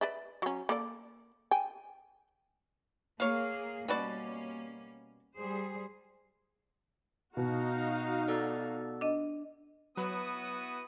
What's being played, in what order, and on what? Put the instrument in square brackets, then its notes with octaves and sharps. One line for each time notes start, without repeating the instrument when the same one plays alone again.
[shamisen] B4 D5 E5
F#3 C#4
A#3 A4 D5
G5 G#5
[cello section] A#3 G#4 [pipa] C#5 F5
[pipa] B2 F#4 D5 [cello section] G3 A#3 C#4
[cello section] G3 G#4 C5
[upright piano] B2 [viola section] D#4 F#4 F5
[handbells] B3 A4 D5
[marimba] D4 D#5
[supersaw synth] F#3 [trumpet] B3 [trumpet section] E4 F#4 D#6 [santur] B4